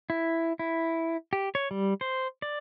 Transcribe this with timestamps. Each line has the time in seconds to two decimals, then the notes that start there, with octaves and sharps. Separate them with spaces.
0.10 E4
0.59 E4
1.33 G4
1.55 C#5
1.71 G3
2.01 C5
2.42 D5